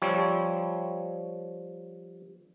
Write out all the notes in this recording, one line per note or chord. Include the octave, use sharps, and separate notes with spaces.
F3 G3 C4 C#5